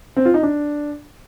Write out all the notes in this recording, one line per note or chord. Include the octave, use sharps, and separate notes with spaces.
C4
F4
D#4
D4